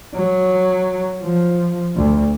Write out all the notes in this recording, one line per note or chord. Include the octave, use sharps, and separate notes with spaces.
F#3
F3
D2